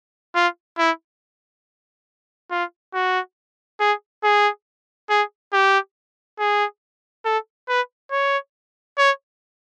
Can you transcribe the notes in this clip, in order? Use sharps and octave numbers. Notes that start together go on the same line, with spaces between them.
F4
E4
F4
F#4
G#4
G#4
G#4
G4
G#4
A4
B4
C#5
C#5